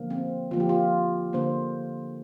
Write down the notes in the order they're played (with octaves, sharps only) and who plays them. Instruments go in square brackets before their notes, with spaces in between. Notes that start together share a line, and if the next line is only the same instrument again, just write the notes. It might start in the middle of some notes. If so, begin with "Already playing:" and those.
Already playing: [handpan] D3 F3 A#3
C4
D3 F3 A#3 F4
G4
F4
D3 A#3 C5